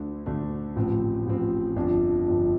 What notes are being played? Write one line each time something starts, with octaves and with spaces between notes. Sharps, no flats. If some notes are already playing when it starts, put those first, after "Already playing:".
Already playing: D2 D3 A3 D4
D2 D3 A3 D4
A1 A2 F3 C4
A1 A2 F3 C4
G1 F2 F3 D4 F4
G1 F2 F3 D4 F4